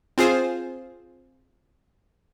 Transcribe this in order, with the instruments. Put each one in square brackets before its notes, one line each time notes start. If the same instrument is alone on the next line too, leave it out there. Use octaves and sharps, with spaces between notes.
[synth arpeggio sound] C4 F4 G#4 C5